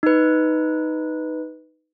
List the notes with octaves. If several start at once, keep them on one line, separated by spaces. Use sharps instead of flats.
D#4 B4